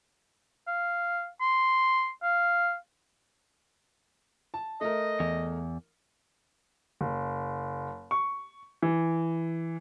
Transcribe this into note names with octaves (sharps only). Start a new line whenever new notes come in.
F5
C6
F5
A5
A3 A#4 D#5
E2
F#1
C#6
E3